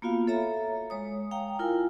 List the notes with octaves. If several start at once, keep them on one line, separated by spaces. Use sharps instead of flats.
A#3 B3 F4 F#4 F5
A4 C#5 E5 A#5
G#3 C#5 D#6
F5 G5 A#5
E4 F4 A#4 G5 G#5